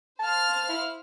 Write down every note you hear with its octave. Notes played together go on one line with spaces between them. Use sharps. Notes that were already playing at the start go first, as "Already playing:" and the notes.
C5 F5 A5 F6
E4